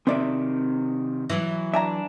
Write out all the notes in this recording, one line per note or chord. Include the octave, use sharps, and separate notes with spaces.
C3 D#3 C4 D5 E5
E3 F#3 E4
D4 E5 G#5 A#5